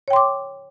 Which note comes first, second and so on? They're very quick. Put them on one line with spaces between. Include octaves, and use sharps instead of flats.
C#5 G5 C6 D6